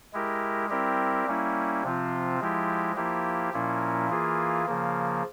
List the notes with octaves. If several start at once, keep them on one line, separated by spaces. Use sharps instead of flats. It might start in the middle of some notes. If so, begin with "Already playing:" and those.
G#3 E4 G4 A#4
G3 C4 E4 G4 A#4
G3 A#3 C#4 E4
C3 F3 C4 F4
F3 G#3 E4 G4
F3 A#3 E4 G4
A#2 F3 A#3 C#4 E4
E3 A#3 F4 G#4
C#3 F3 A#3